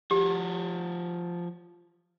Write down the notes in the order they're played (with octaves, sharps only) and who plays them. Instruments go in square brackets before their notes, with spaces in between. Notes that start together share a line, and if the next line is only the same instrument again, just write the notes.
[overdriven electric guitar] F3 F#4 [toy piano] G4